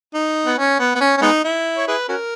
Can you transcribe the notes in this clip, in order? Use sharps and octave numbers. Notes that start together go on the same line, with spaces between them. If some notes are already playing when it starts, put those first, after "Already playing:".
D#4
B3
C#4
B3
B3
C#4
C#4
G#3 B3 D#4
E4
C#5
E4 G#4 B4
C#4 F#4 A#4